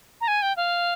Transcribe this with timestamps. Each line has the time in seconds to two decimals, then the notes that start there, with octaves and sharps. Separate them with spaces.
0.21 A#5
0.28 G#5
0.42 G5
0.57 F5